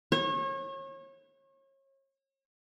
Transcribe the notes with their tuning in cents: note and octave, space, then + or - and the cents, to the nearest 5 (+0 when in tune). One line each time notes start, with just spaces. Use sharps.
C#5 -35